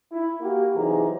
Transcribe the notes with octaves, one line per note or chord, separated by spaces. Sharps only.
E4
A#3 F#4 G4
C3 E3 F#3 D#4 G#4 A#5